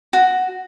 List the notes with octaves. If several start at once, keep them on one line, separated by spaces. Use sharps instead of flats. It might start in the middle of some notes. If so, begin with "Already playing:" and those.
F#4